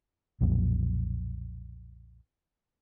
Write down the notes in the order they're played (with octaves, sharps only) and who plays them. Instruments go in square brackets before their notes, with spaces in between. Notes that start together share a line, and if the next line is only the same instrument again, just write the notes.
[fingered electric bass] B1 F2 A#2 F#3